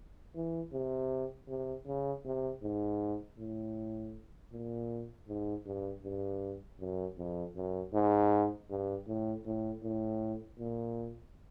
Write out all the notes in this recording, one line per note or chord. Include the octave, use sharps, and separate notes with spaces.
E3
C3
C3
C#3
C3
G#2
A2
A#2
G#2
G2
G2
F#2
F2
F#2
G#2
G2
A2
A2
A2
A#2